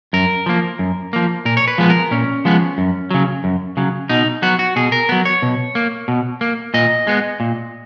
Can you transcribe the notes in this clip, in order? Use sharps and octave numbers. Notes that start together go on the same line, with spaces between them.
F#2 A#4
F3 A#3
F#2
F3 A#3
A#2 A#4
C#5
B4
F3 G#3 B3
A#4
A#2 C#4
F3 G#3 B3
F#2
C#3 F#3
F#2
C#3 F#3
B2 D#4
F#3 B3 F#4
F#4
B2 G#4
A#4
F#3 B3
C#5
B2
A#3
B2
A#3
A#2 D#5
G#3 B3
A#2